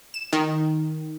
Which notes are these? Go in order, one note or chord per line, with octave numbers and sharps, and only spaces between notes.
E7
D#3